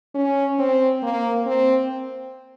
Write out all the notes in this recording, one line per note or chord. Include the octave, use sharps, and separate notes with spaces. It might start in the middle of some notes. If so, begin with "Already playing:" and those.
C#4
C4
A#3
C4